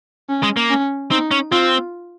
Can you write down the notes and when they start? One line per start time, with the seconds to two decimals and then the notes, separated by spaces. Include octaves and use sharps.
0.29 C#4
0.43 G#3
0.57 A#3
0.70 C#4
1.11 C4 D#4
1.31 C#4
1.52 C4 F4